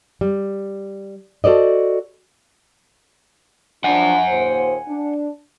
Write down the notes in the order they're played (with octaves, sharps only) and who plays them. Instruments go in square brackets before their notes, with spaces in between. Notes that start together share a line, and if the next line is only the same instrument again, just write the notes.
[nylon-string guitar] G3
F#4 A4 C5 D5 D#5
[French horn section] F3 D4 [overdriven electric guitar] F#5 G#5
[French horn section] D#2 A#2 C5
D4